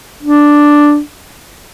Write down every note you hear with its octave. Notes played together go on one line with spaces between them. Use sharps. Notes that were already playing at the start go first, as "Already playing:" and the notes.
D4